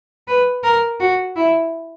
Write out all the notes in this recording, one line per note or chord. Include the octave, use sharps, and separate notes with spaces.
B4
A#4
F#4
E4